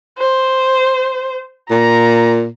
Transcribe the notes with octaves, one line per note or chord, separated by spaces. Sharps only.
C5
A#2 A#5